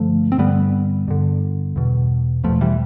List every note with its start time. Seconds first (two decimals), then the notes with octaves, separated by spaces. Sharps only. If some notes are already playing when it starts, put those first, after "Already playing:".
Already playing: G2 D3 F3 A3
0.32 C4
0.38 G2 D3 G3 B3
1.08 G2 D3
1.76 E2 B2
2.44 E2 B2 F3 A3
2.61 E3 G3